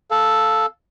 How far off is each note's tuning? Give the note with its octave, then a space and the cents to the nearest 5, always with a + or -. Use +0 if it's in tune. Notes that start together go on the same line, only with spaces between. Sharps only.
A4 +0 F5 +0